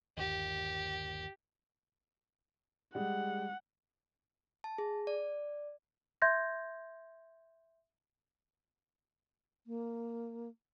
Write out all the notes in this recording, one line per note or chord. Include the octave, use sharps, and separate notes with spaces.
G1 D#2 G4
G3 G#3 F#5
A5
G#4
D5
E5 C6 G6 G#6 A#6
A#3